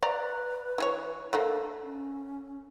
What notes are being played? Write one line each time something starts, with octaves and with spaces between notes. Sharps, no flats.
B4 D5 A#5
E3 G#4 C#5
D3 A3 A#3 A4
C#4